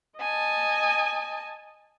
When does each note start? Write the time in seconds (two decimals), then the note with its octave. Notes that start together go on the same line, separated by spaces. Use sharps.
0.18 D#5 G#5 A5